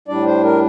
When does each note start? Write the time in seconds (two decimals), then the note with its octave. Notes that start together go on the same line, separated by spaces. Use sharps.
0.08 A2 G3 D4 D5
0.26 C5
0.44 A#4